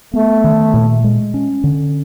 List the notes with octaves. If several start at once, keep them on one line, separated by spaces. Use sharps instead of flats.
A3 B3
D#3
A#2
G#3
C#4
D3